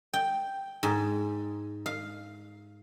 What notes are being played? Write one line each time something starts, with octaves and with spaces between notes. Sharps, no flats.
G5
G#2
F5